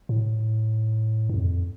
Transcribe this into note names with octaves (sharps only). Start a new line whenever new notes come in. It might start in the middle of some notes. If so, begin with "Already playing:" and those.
A2
G2
F2